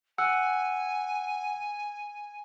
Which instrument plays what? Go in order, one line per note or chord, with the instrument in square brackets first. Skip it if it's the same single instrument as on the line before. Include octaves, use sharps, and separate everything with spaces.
[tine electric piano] F#5 [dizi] G#5 [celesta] E6 F#6